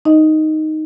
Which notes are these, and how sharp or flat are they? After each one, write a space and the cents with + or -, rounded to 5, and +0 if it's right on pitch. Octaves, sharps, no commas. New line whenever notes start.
D#4 +0 D#5 +0